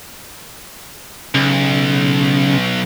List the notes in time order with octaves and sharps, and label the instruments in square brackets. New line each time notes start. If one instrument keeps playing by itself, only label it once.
[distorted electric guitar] B1 [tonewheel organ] C#3